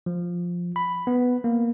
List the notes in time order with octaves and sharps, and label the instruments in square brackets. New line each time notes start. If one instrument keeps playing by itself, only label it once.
[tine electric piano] F3
B5
B3
A#3